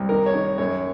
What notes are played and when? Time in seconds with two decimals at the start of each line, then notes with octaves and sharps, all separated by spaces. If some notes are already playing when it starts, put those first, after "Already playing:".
Already playing: C2
0.09 D#3 A#4
0.26 C#5
0.34 D#3
0.58 F#2 C#5